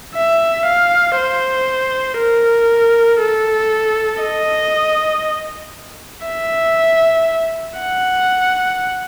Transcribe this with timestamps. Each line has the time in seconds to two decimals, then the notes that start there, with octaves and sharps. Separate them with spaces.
0.15 E5
0.66 F5
1.17 C5
2.19 A#4
3.21 A4
4.23 D#5
6.27 E5
7.80 F#5